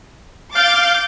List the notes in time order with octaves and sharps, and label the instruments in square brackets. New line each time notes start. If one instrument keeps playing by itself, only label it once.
[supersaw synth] F5 [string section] D6 G6 A6